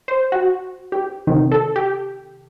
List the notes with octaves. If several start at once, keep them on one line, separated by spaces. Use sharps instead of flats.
C5
F#4
G4
C3 D#3
A4
G4